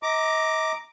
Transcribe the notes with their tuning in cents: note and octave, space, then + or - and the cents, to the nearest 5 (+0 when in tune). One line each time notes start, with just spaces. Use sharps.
D#5 +35 A#5 +0 D6 +0